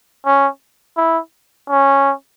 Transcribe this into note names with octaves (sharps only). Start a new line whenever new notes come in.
C#4
E4
C#4